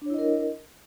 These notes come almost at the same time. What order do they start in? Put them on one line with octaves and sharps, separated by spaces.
D4 C#5 E4 D#5 A#4